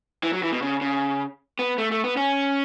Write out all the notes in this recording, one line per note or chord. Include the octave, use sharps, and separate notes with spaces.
E3
F#3
E3
B2
C#3
C#3
B3
A3
A3
B3
C#4